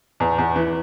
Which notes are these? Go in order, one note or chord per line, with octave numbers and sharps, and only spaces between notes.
E2
E2
E3